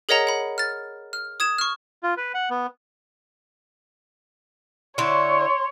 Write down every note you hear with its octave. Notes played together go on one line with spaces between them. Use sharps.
G#4 A#4 C#5 D#5 F#5 A#5
F#5 B5
F6 A6
F6
D#6 G#6 E7
C#6 F6
F4
B4
F#5
B3
D3 E4 C#5 C6